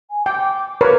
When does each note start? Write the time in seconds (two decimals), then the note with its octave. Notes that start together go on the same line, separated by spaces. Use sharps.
0.10 G#5
0.26 G5 D6
0.81 A#4 B4 C#5